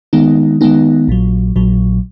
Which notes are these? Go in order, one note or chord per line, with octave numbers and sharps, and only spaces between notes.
D#3 G#3 B3 D#4
D#3 G#3 B3 D#4
A#1 A#2 F#3
A#1 A#2 F#3